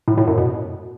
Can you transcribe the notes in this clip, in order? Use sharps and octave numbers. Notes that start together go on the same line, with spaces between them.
A2
A2
F#2
B2